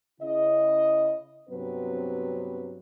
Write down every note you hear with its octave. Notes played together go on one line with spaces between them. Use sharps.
C#3 E4 D#5
G2 C3 F#3 B3 C4 B4